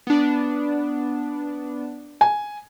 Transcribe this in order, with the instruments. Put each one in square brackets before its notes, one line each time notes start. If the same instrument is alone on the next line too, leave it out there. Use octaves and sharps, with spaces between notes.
[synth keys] B3 D4
[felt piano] G#5